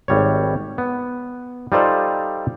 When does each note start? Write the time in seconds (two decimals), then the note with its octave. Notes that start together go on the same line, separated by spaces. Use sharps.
0.08 G#1 G3 C#5
0.78 B3
1.72 G3 D#4 F4 A4 C5 D5